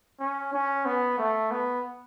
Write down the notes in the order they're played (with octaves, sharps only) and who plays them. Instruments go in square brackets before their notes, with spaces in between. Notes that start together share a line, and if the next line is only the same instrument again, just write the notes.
[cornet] C#4
C#4
B3
A3
B3